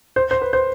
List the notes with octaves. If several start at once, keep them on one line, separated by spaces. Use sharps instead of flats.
C5
C5
B4
C5